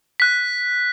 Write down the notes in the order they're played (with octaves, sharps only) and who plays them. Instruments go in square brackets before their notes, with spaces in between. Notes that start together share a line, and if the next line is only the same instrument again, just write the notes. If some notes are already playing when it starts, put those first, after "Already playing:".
[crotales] F#6 B6